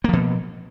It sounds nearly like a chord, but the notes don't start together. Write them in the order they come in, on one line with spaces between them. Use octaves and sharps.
A#3 F3 B2